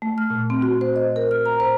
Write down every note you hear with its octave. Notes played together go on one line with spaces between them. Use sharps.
A3
F6
A#2
C4
F#4
C5
D#5
A#4
F6
A#5
C5